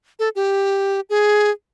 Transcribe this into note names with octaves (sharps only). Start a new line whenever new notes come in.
A4
G4
G#4